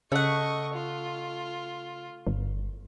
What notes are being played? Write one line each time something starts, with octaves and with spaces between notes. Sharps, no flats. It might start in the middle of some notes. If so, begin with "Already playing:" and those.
C#3 A3 D#5 F#5 C#6
F4
G1